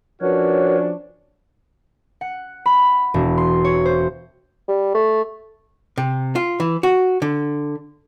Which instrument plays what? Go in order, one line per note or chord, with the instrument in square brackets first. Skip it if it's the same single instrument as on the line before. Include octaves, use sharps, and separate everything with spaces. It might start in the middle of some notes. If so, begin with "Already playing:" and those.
[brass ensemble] F3 C#4 D4 [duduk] F#4 [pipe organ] A#4 B4 C#5
[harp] F#5
B5
E1
C6
C#5
C5
[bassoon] G3
A3
[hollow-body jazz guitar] C3
F4
E3
F#4
D3